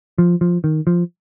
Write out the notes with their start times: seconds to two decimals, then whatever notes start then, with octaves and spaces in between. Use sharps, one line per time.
0.18 F3
0.41 F3
0.64 D#3
0.87 F3